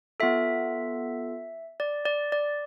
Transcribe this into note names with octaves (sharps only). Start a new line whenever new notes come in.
B3 F4 A4 E5
D5
D5
D5